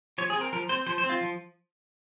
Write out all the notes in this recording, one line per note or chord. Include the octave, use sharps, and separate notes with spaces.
F3 C#5
G#4
C4
A#4
F3 A#4
C4 C5
F3 C5
C5
C4
F4
F3